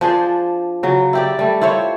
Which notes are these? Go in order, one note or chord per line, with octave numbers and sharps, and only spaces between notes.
F3 D4 G#4 C5
C#3 F#3
E4 G4 D5
G3 A3
E4 F4 C5 C#5